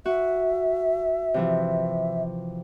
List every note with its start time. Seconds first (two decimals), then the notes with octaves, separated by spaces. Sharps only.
0.06 F#4 E5
1.34 C3 E3 F3